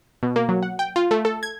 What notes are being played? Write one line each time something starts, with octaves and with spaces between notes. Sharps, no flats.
B2
A#3
F#3
F#5
G5
F4
A3
A4
G#6